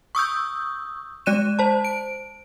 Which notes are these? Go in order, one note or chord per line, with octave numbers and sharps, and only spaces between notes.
C#6 D#6 E6 G6
G#3 D5 F#6 D#7 E7
C5 A5
D7